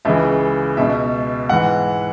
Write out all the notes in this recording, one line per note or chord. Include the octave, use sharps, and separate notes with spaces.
C#2 C#3 E3 E5
C#2 B2 E5
G#2 E3 F#5